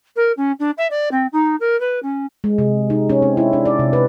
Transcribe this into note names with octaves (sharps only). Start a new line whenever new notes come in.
A#4
C#4
D4
E5
D5
C4
D#4
A#4
B4
C#4
G#3
C3
D#4
C#4
C4
E4
D4
D5
C3
B4